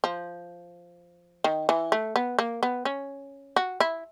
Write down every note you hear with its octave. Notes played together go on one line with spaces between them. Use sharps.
F3
D#3
E3
A3
B3
A#3
B3
C#4
F#4
E4